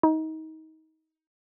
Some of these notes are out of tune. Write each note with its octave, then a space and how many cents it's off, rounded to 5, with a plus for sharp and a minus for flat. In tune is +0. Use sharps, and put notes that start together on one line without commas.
D#4 +30